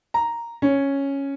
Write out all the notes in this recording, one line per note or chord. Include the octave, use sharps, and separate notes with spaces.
A#5
C#4